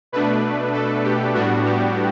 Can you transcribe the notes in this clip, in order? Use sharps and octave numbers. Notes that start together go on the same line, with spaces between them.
B2 A3 D4 B4
A4
G4
A2 G3 B3 D4 F#4
G4